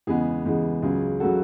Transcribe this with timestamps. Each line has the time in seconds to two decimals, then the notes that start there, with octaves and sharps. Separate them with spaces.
0.07 E2 C#3 G#3 B3 G#4
0.45 E2 C#3 G#3 B3
0.82 C#2 C#3 F#3 G#4
1.20 C#3 F#3 F#4 A4